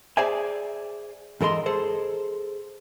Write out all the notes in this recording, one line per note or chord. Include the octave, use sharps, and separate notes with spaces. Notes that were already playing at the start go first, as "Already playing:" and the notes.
G#4 C5 D5 E5 G#5
G#2 E3 A4 A#4 D#5 C6
G#4 A4 C5